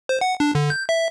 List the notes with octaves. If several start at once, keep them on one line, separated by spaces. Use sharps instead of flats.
C5
F#5
D4
D3
G6
E5